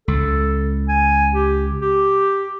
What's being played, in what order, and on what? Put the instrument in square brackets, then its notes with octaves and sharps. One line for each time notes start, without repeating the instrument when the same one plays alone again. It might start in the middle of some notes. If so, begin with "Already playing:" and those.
[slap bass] C#2 [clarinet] A4
[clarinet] G#5
G4
G4